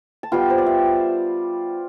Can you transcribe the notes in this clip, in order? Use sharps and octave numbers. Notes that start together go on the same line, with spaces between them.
A5
G3 B3 F4 G5
C5
D5
E5